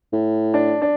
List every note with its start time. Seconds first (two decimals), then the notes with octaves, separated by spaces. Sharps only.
0.13 A2
0.54 D4
0.82 D4